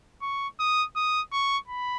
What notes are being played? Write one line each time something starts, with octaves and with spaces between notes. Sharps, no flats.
C#6
D#6
D#6
C#6
B5